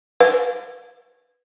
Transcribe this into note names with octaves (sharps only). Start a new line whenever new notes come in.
B4